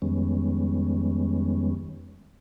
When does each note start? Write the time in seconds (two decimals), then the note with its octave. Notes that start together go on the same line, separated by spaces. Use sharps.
0.02 F2 D#3 G3 G#3 B3 C#4